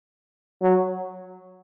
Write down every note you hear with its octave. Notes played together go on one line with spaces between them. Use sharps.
F#3